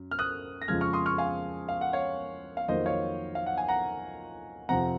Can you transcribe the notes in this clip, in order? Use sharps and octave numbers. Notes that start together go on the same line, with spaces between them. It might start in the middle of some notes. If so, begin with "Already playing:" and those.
Already playing: F#2
F6
D#6 F#6
A#6
F2 C#3 F3 G#3 F6 G#6
C#6 F6
C6 D#6
C#6 F6
F5 G#5
F5
F#5
C#5 F5
F5
F2 D#3 F#3 A#3 C5 D#5
C#5 F5
F5
F#5
G#5
F#5 A#5
F2 C3 F3 C4 F#5 A#5